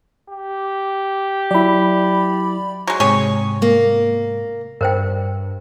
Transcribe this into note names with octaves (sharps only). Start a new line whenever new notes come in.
G4
F#3 E4 D5 B5
F#3 G#3
G#2 C3 G4 G#4 C#5
A#3
G2 A#4 C5 G5